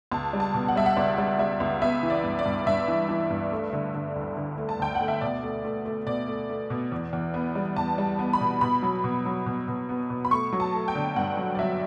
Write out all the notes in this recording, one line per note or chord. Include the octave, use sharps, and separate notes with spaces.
C#2 A5
G3
A5
B2
F#5
G3 E5
F#5
C#2 D5
G3
G3 E5
C#2
B3 E5
E3
D5
G2
D5
G2
G2 E5
E3
E3
G2
A3
D3
D3
D2
D3
A3
A5
D2 G5
F#5
A3
E5
B2 D5
A3
A3
A3
B2 D5
A3
A3
B2
E2
E2
B3
G3
E2 A5
G3
B3
B5
B2
B2 B5
F#3
B2
F#3
B2
B2
B3
B2
B5
A3 C#6
F#3
A5
A3
G5
D3
G2 F#5
F#3
D5
F#3 E5